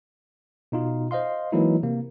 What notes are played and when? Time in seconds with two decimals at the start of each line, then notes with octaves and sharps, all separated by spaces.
0.72 B2 D#4 F4
1.11 C5 D#5 F5 C6
1.52 E3 F#3 G#3 A#3 D#4 E4
1.83 C3 A#3